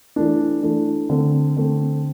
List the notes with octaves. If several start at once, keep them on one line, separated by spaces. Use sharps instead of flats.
E3 A3 D4
E3 A3 D4
D3 A3 C4
D3 A3 C4